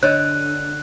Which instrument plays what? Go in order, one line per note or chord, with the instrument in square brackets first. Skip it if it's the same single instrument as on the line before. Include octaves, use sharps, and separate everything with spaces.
[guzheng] D3 [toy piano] C#5 D#5 [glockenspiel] F#6